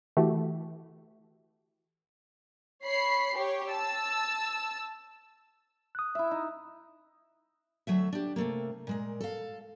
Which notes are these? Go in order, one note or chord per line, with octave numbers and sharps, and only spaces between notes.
E3 A3 F#4 G4
C#5 B5 C7
G4 C#5
A5 E6
D#6 F#6
E4 E5
D#4
D2 F#3 A3 E5
D4 G4
C3 A3 A#3
A#2 G#3 A#4
A4 F5